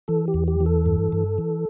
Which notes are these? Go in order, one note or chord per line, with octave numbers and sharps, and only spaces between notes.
E3 A4
G4
E2
G4
E3
A4
G2
G2
E3